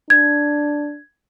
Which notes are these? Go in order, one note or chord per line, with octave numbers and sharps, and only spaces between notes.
D4 G#6